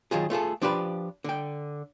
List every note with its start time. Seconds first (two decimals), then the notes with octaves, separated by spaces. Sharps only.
0.11 D#3 F#3 F4 G#4
0.30 A3 F4 G#4 A4
0.62 F3 D4 F4 G4 B4
1.24 D3 G5